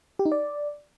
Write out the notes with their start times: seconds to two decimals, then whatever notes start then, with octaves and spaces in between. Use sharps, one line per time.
0.19 G4
0.25 D#4
0.32 D5